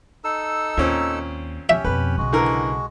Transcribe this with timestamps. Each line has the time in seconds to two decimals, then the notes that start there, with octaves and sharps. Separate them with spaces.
0.24 D#4 A4 E6
0.77 D#2 A#2 C4 C#4
1.69 C#4 G4 E5
1.85 F2 B2 B4
2.18 B1 C#3 G#3 F#4
2.33 D3 E3 A#4